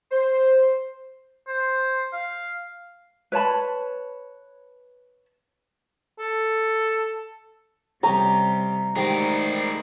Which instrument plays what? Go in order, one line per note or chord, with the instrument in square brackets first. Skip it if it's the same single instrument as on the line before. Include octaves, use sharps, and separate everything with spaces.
[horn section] C5
[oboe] C5
F5
[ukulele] B4 C#5 A5 B5
[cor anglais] A4
[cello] C3 G3 [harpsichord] C#4 G4 [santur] A#5 D#6
[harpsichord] G#2 D#3 G3 [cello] A3 D#4 [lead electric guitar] G#4 A#4